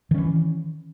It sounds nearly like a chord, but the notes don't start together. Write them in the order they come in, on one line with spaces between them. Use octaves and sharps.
D#3 C#4 E3